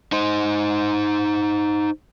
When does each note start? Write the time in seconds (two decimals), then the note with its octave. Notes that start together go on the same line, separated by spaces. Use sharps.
0.12 D#4 C5